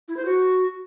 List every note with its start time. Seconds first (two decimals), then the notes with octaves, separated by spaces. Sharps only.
0.08 E4
0.17 C5
0.25 F#4